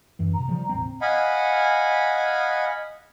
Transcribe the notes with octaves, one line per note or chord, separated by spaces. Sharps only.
F#2 E3
C3 A#5
C#3 F3 G3
E1 A1 C4
D#5 F5 F#5 G#5 B5